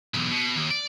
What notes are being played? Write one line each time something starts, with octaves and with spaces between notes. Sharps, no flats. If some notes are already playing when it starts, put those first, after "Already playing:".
B1 E2
B2
D#2
D5